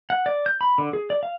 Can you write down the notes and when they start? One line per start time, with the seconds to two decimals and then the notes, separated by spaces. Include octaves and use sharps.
0.10 F#5
0.26 D5
0.46 G6
0.61 B5
0.78 D3
0.93 G#4
1.10 D5
1.23 F5